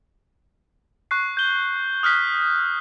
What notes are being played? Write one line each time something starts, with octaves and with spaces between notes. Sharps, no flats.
C#6 F#6 C7
G6 G7
D#6 F6 F#6 B6